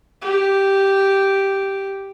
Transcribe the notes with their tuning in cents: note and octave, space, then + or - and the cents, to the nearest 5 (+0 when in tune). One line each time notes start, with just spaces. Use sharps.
G4 -5